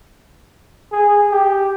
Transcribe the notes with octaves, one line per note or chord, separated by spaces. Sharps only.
G#4
G4